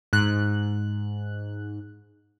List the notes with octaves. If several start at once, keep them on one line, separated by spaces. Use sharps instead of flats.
G#2 F#6